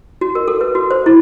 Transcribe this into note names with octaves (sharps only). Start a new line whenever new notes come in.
F#4
A#4
A4
B4
F#4
C5
E4